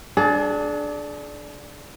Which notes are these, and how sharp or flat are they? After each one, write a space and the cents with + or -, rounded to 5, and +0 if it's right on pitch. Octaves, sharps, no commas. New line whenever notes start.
D4 +0 G#4 +40